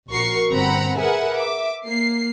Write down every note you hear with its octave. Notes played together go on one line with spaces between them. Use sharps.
A#1 F#4 A#4 C#6 C7
G1 C4 F#5 A#5 B5
G#4 A#4 B4 E5 F#5 G#5
E5 D6
A#3 C7